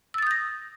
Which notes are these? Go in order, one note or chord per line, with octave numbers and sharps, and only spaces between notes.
D#6 E6 G6 A6 A#6